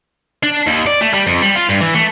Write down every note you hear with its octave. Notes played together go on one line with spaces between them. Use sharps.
D4
D#2
D5
A3
G3
F2
G3
F4
G2
E3
A3